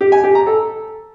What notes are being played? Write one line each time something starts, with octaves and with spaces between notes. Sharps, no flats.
G4
G#5
G4
A#5
A4